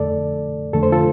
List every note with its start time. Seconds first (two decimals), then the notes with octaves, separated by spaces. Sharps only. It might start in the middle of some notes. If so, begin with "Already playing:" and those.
Already playing: F2 D3 A3 A4 D5
0.73 F2 D3 A3 A4
0.83 C5
0.92 F4 A4